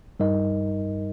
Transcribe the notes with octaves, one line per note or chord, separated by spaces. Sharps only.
G2 G3 D#4 A#4 D#5